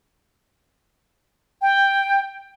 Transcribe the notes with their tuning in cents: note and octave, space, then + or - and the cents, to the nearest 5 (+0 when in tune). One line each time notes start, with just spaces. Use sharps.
G5 +5